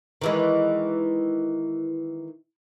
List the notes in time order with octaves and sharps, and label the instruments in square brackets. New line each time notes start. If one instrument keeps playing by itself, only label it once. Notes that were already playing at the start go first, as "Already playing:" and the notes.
[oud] D#3 E3 G#3